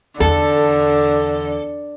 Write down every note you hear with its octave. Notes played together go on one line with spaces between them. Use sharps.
E2 D3 A4